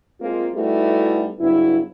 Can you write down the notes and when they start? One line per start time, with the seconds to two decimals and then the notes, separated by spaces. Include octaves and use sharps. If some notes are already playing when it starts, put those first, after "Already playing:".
0.21 G#3 A#3 C4 F4
0.54 G3 A3 B3 D#4 E4 F#4
1.40 G2 C#3 F#3 B3 E4